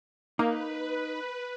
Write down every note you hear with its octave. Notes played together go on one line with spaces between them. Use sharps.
A#3 D#4 B4